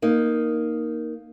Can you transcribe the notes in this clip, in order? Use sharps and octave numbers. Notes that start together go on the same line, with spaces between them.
A#3 D#4